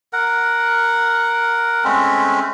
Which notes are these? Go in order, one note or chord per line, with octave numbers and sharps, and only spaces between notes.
A#4 F#5
G#3 A3 C4 C#4